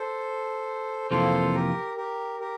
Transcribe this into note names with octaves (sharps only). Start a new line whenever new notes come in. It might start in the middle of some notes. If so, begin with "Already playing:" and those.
Already playing: A4 C5
F2 C3 E3 A#3 F4 A4 C5
G4 A#4
G4 A#4
G4 A#4